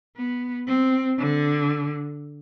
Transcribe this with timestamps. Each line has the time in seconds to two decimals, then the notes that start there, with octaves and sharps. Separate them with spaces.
0.17 B3
0.67 C4
1.19 D3